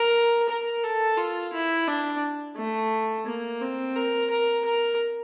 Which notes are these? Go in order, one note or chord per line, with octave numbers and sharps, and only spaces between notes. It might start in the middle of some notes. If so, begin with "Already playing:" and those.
Already playing: A#4
A#4
A4
F4
E4
D4
A3
A#3
C4
A#4
A#4
A#4